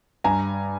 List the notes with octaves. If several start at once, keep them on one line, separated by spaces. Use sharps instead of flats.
G2 G#5 A#5